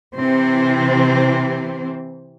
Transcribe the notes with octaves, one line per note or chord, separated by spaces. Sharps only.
C3 E3 C4